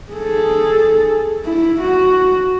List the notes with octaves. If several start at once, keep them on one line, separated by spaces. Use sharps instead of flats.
G#4 A4
E4
F#4